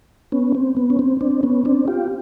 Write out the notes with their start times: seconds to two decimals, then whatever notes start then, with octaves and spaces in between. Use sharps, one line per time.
0.32 B3 C#4
0.55 C4
0.77 B3
0.90 C#4
0.99 C4
1.21 C4 D4
1.43 B3 C#4
1.65 C4 D4
1.88 F4 G4